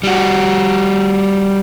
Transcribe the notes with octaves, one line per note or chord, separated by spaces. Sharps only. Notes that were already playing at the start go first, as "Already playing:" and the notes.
G3 F#4